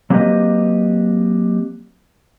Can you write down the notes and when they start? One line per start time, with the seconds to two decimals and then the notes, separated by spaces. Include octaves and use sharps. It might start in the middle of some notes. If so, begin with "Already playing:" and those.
0.10 F#3 A#3 C4 G4 B4 D#5